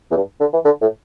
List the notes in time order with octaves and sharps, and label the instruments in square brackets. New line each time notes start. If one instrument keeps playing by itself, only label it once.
[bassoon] E2
G2
D3
E3
D3
A2